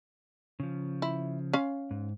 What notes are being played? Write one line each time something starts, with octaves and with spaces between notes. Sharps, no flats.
C#3 F3
E4
C#4 F5
G#2